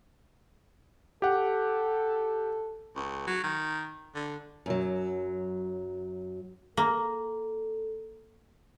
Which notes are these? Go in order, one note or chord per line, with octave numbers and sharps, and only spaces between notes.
G4 A4 F#5
C#2
F#3
D#3
D3
F#2 F#3
A#3 A4